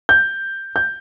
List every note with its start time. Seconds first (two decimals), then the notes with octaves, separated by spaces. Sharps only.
0.09 G6
0.76 G6